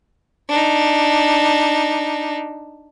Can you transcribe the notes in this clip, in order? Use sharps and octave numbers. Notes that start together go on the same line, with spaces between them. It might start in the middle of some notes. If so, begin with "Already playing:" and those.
D4 D#4